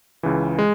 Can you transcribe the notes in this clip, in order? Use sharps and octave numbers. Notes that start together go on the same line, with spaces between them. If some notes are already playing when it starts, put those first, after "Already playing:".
C#2 C#3 E3
G#3